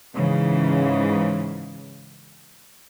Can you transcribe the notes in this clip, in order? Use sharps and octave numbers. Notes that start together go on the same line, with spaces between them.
G#2 C#3 E3